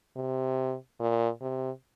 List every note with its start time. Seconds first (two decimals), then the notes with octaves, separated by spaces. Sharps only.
0.16 C3
1.00 A#2
1.41 C3